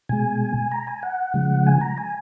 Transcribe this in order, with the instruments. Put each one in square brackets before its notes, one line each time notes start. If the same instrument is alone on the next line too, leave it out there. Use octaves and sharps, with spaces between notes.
[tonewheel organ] B2 G#3 G#5
A#5
G#5
F#5
C#3 F3 G#3
G#5
A#5
G#5